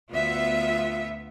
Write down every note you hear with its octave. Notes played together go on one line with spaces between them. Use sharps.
D2 B3 F4 E5